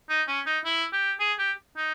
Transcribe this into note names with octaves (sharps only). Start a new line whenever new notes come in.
D#4
C#4
D#4
E4
G4
G#4
G4
D#4